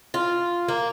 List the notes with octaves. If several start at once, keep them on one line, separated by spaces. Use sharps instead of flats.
F4
A#3